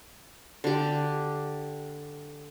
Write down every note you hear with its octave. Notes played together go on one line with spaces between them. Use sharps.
D3 G4